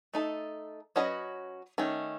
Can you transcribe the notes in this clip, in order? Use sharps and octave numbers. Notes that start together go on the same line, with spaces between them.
A3 D#4 A4
F#3 C#4 F#4 B4 D#5
D#3 A3 C#4